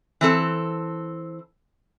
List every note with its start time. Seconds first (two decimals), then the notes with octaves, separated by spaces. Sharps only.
0.21 E3 C4 A4